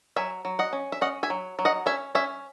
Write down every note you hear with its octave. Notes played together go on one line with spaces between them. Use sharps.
F#3 E5 G#5
F#3
D#5 F#5
C#4
E5
C#4 D#5 F#5
E5 G#5
F#3
F#3
D#5 F#5
C#4 E5 G#5
C#4 E5 G#5